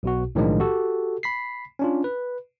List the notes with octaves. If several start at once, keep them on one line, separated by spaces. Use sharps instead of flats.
B1 B2 F#4
B1 A2 D#3 F3 G#3 D4
F#4 G4 A4
B5 B6 C7
C#4 D4 F4
B4